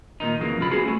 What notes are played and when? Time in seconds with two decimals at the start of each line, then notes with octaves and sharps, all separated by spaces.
0.20 A#2 D#3 D#4
0.40 F2 C#3 E3 A#3
0.59 B1 G2 F4 B5
0.71 B3 C#4 F#4 G#4
0.86 A3 G#4